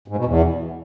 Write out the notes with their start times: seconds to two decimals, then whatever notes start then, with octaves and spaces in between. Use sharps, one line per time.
0.08 G#2
0.16 B2
0.25 E2